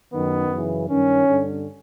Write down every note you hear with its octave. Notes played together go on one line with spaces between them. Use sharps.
F#2 D#3 B3
F#2 C#3 E3
G2 D#3 C#4
G2 D3